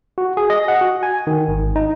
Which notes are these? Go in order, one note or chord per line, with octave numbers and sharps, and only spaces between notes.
F#4
G#4
D#5
F#5
F#4
G#5
D#3
G#1
D#4